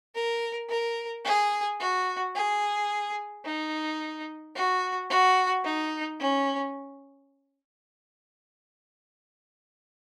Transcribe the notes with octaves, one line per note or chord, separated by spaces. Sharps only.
A#4
A#4
G#4
F#4
G#4
D#4
F#4
F#4
D#4
C#4